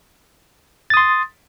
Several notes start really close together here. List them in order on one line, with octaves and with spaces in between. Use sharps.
A6 D#6 C6